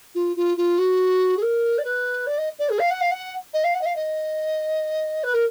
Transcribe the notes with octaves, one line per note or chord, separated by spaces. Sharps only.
F4
F4
F4
F#4
G#4
A#4
D5
B4
D5
D#5
D5
G#4
F5
F#5
F5
F#5
D#5
F5
F#5
D#5
F5
D#5
B4
A#4